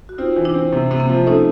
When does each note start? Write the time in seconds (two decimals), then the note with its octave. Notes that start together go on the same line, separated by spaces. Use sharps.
0.09 F#4
0.18 C4 D#4 F4
0.36 E3
0.45 D4 E4
0.54 C4
0.73 C3
0.91 C3
1.00 A#3 C4
1.09 F3
1.27 A3 C#4 D#4